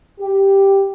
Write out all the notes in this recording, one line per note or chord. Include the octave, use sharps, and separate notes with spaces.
G4